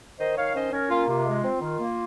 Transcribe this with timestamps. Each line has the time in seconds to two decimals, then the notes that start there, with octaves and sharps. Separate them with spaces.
0.20 D#3 C5 D#5
0.37 D#3 C#5 F5
0.55 C#4 C5 D#5
0.72 C#4 A#4 C#5
0.90 A#3 F4
1.08 C3 F4
1.26 G#3
1.44 C4
1.61 D#3
1.80 A#3